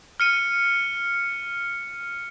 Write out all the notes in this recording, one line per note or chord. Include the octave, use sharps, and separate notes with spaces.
F6 C#7 D#7